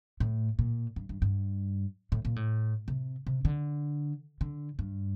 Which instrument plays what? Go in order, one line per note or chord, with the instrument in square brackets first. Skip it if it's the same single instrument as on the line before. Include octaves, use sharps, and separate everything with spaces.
[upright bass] A2
A#2
G2
G2
G2
A2
A#2
A2
C3
C3
D3
D3
G2